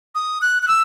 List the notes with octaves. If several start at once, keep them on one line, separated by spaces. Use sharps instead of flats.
D#6
F#6
F#6
E6